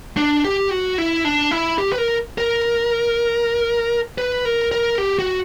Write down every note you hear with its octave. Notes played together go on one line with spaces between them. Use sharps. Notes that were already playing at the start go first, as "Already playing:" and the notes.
D4
G4
F#4
E4
D4
E4
G4
B4
A#4
A#4
B4
A#4
A#4
G4
F#4